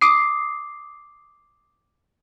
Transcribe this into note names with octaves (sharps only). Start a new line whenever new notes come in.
D6 D#6 C7